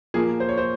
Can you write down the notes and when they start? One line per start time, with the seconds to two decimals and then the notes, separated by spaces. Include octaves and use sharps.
0.14 A#2 F3 A#3 G#4
0.40 C5
0.49 C#5
0.57 C5